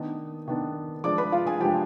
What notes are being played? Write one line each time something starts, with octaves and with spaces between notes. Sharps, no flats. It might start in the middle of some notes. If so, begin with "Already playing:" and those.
Already playing: D#3 B3 D4 D#5
D#3 B3 D4
F3 G#3 D4 D5 D6
B4 B5
F4 F5
G#4 G#5
F3 G#3 D4 G4 G5